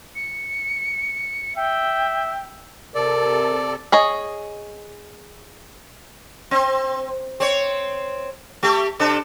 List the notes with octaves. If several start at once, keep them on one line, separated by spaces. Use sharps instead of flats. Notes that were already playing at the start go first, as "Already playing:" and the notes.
C#7
E5 G5
C3 A4 A#4 D5
G#4 C#5 D#5
C4
C4 C#5
A3 G4
C3 D4 A4